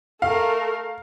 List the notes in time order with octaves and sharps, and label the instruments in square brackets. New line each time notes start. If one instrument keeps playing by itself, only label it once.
[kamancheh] A3 A#4 [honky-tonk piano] F5